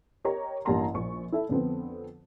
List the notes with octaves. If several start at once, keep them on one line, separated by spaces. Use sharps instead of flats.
G4 A#4 C#5 D#5 A#5
A1 G2 A#3 A5 A#5 C6
A#1 C#6
E4 A4 E5
F2 D3 B3 C4